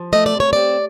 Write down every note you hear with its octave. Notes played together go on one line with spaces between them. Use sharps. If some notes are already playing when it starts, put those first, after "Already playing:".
Already playing: F3
A3 D#5
D5
C3
C#5
C4 D5